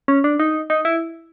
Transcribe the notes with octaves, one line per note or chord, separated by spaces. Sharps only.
C#4
D4
D#4
D#4
E4